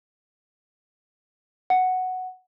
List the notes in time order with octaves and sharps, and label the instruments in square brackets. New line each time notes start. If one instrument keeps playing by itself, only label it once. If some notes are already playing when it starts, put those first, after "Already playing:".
[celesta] F#5